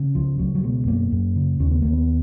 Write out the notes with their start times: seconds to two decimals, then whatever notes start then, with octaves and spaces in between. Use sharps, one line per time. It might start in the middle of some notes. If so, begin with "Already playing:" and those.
Already playing: C#3
0.15 C#2 F3
0.39 C#2 F#3
0.55 F#3
0.63 B2 G#3
0.87 F#2 A#3
1.12 F#2
1.36 C#3
1.60 D#2 C#4
1.71 B3
1.82 D#2 A#3
1.93 B3